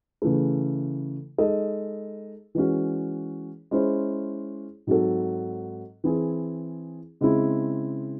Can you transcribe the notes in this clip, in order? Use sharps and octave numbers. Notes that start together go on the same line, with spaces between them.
C#3 E3 A3
G#3 D#4 A4 D#5
E3 G#3 C#4 F#4
G#3 C#4 E4 C5
G#2 F#3 C4 F#4 A4
E3 C4 E4 G#4
C#3 G#3 C4 E4